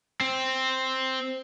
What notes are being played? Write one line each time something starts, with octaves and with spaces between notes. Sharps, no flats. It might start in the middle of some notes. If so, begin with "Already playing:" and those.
C4